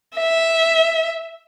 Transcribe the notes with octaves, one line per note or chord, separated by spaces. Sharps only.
E5